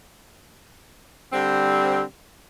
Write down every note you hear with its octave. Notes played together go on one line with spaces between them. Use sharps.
D3 G3 C4